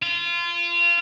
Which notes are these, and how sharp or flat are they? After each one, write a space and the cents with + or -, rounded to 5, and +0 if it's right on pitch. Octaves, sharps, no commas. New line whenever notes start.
F4 -25